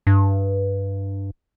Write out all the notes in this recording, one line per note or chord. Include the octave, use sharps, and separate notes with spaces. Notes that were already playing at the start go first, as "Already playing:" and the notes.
G2